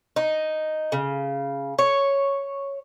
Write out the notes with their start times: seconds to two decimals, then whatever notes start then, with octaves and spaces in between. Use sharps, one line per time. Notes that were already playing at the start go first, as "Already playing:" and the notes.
0.16 D#4
0.92 C#3
1.79 C#5